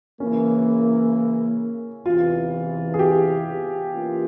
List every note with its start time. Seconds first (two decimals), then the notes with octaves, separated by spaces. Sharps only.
0.20 C#3 E3 A#3 C#4
2.06 E2 C3 E3 F4
2.94 G#4
2.99 G4
3.92 E3 A#3 C#4 F4